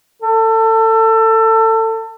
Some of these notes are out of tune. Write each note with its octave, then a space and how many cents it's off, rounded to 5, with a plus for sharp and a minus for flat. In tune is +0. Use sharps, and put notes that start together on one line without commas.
A4 +25